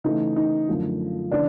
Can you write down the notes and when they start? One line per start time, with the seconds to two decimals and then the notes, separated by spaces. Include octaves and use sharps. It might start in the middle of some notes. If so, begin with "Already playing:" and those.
0.04 C#3 E3 A3 D#4
0.36 D#4
0.68 F#2 D3 F3 A3
1.31 C#3 E3 D4